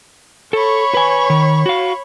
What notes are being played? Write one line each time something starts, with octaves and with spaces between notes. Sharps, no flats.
A4 C#5 B5 C#6
B4 G#5
D#3
F#4 F5